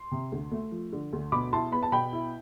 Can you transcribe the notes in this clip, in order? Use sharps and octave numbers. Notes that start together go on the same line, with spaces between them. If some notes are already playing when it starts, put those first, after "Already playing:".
Already playing: C6
C3
D2
A3
F3
D3
D2
B2 B5 D6
E4 A5 C6
B3 B5
A5
B2 G5 B5
E4